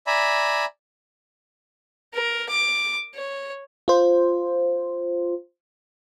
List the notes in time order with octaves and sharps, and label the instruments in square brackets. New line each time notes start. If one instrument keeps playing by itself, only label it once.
[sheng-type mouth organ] D5 E5 G#5 A#5 B5
[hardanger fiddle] A#4
D6
C#5
[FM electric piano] F4 C5